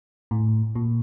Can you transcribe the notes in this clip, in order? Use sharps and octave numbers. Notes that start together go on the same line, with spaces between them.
A2
A#2